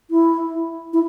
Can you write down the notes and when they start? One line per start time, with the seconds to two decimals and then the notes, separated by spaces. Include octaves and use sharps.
0.11 E4
0.93 E4